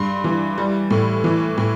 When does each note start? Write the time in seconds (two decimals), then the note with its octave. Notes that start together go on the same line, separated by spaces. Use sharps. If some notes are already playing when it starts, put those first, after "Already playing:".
Already playing: G2 C6
0.24 E3
0.58 G3
0.91 A2
1.24 E3
1.58 A2